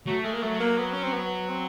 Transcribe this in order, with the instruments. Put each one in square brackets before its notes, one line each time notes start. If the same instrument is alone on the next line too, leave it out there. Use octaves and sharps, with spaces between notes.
[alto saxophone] F#3 [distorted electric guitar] A3
[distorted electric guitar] G#3 [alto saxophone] A3
[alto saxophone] A#3
[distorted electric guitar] F#3 [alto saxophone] A3
[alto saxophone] A#3
B3
C#4
C4
B3
C4